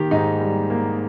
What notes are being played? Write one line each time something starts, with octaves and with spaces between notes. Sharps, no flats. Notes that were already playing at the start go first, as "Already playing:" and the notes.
Already playing: D#3 A#3 G4
G#2 D#4
G3
A#3